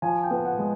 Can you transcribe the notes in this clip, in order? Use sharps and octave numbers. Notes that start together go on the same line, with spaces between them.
F3 G#5
G5
B3
F#5
G#3